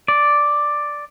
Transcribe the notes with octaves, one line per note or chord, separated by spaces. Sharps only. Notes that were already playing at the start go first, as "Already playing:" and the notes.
D5